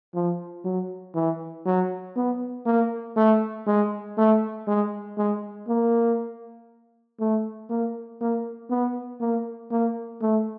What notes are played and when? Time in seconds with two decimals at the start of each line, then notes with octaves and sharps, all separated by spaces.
0.14 F3
0.65 F#3
1.15 E3
1.66 F#3
2.16 B3
2.66 A#3
3.17 A3
3.66 G#3
4.18 A3
4.67 G#3
5.18 G#3
5.68 A#3
7.20 A3
7.70 A#3
8.21 A#3
8.70 B3
9.21 A#3
9.71 A#3
10.22 A3